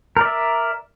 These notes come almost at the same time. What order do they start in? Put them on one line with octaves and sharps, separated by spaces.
A#4 D5 E5